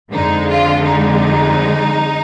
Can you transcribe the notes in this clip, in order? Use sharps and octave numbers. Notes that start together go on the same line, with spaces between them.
F2 D3 G#3 D#4
F4
D#4